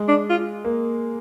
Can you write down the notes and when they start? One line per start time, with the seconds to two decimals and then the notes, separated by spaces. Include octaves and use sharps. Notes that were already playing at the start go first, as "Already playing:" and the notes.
Already playing: G#3
0.08 D4
0.30 F4
0.65 A#3